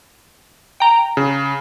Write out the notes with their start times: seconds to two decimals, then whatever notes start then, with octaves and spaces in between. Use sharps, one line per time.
0.80 G5 A#5
1.17 C#3